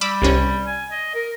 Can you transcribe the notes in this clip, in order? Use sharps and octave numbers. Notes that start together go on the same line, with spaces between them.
G3 B5 D6 E6
C2 C3 C#4
G#5
D#5
A#4